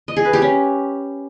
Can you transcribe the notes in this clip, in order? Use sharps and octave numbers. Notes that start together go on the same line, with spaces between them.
D#5
G#4
B4
G4
C#4